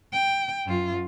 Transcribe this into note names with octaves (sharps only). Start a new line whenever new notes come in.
G5
F#2 F4